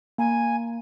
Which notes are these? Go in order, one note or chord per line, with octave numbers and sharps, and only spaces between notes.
A#3 G#5 A#5